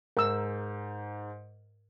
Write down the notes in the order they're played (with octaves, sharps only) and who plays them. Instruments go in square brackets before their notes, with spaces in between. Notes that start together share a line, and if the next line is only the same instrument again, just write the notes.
[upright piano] G#2 [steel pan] A#4 E6